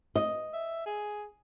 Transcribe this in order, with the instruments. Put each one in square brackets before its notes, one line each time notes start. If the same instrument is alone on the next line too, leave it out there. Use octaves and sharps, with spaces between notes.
[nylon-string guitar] D#5
[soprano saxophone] E5
G#4